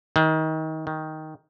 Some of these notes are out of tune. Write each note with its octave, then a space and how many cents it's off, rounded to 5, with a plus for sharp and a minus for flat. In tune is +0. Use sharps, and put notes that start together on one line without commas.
D#3 +30
D#3 +10